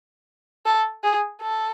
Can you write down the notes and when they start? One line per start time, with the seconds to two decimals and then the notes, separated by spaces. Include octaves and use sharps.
0.65 A4
1.03 G#4
1.42 A4